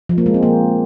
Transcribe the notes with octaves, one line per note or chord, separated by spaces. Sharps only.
F3
A#3
G#3
C4
A#3